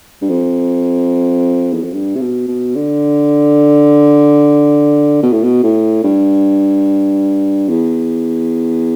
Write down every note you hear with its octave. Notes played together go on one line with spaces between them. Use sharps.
G2
F2
E2
F2
G2
C3
B2
B2
D3
B2
A2
B2
A2
G2
E2